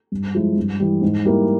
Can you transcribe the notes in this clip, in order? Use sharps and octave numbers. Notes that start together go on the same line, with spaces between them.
G2
F3 G#3 E4
G2
E3 G3
G#2
G3 A#3 E4